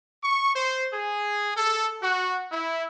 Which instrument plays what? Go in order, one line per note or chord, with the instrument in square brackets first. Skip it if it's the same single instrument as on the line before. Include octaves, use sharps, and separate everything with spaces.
[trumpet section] C#6
C5
G#4
A4
F#4
E4